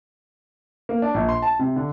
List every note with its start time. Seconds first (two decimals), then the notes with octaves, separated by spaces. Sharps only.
0.89 A#3
1.02 D4
1.14 A#1
1.29 C6
1.42 A5
1.59 C3
1.76 D3